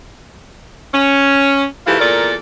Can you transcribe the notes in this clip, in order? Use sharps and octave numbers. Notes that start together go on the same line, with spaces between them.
C#4
G#2 E3 A3 F4 G4 A4
E2 A#2 A4 A#4 D5